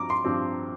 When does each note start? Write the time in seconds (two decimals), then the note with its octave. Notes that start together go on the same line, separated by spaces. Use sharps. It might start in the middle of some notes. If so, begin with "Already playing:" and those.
Already playing: G2 F3 C4 A#5 D6
0.10 C6
0.25 G2 F3 C4